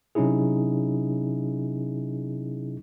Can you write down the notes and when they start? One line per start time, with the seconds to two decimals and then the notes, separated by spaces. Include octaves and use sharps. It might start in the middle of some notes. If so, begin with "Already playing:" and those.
0.15 C3 F#3 C#4 D#4 E4 G#4